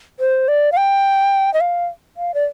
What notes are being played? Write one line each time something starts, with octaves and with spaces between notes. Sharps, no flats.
C5
D5
F5
G5
D#5
F5
F5
D5